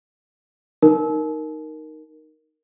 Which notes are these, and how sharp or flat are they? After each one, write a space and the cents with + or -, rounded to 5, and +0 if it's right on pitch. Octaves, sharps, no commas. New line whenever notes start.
D#4 +0 A#4 +0